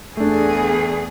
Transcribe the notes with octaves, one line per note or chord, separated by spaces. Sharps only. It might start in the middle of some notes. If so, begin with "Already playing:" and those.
E2 A3 D4 G#4